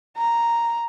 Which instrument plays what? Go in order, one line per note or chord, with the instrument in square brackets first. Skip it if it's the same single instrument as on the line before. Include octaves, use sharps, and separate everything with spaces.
[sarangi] A#5